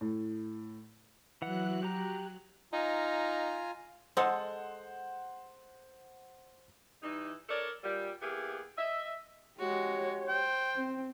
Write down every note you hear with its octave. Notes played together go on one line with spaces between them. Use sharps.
A2
E3 F#3 F#5 F#6
G4 A#5
D#4 F4 G#5 A#5
G#3 A4 C5 F#5
E3 G3 D#4
D4 A4 A#4 C#5 D5
A#2 G3
A#3 B3 E4 G4 G#4
D#5 E5
G#3 F#4 G4 C#5
C5 G5
C4